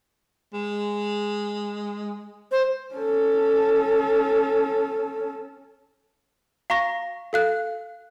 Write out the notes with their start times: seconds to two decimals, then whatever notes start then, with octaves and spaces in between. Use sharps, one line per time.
0.54 G#3
2.51 C5
2.95 C#4 A4
6.70 F5 A#5 C#6 A#6
7.33 A4 F5 F#6